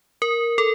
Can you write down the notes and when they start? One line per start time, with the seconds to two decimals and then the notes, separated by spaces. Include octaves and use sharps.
0.22 A#4
0.58 A4